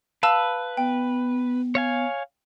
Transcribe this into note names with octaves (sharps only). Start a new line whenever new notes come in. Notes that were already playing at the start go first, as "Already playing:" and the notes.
B4 F5 A5 E6
B3 G5
C#5 F5 G#5